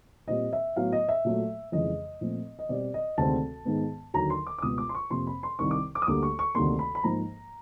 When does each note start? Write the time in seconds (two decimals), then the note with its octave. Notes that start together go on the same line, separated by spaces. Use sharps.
0.28 A#2 G3 C4 D#5
0.53 E5
0.76 A2 F#3 B3 F5
0.92 D#5
1.09 E5
1.25 A#2 F#3 A3
1.72 F2 C#3 E3 G#3 D#5
2.21 A#2 F3 A3 C4
2.59 D#5
2.69 B2 G3 C4 D5
2.94 D#5
3.17 D2 C3 D#3 G#3 C4 A5
3.65 G#2 D#3 G#3 B3
4.14 D#2 D3 F#3 A#5
4.30 C6
4.47 D6
4.58 D6
4.62 C#2 B2 G3 B3 D#6
4.78 D6
4.89 C6
4.95 C#6
5.11 F2 C3 F3 A#3 C6
5.27 B5
5.43 C6
5.59 C2 C3 D#3 C#6
5.71 D6
5.95 D6
6.02 D#6
6.07 D2 D3 G3 A#3 D6
6.23 C#6
6.39 C#6
6.55 D2 C3 D#3 G3 A#3 C6
6.79 B5
6.95 B5
7.03 G#2 F3 A#3 A#5